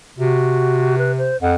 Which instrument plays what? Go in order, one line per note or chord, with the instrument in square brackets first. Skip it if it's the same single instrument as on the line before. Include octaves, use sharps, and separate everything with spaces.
[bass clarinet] C3 [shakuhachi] F#4
[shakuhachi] B4
C5
[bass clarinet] F2 [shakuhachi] F#5